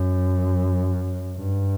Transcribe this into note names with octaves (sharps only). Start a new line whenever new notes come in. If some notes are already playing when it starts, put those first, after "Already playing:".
Already playing: F#2
G2